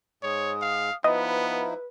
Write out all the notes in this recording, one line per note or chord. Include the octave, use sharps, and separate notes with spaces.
G#2 G#3 C#5 D#6
F5
F3 B3 D#4 E4 B4 D#5 D#6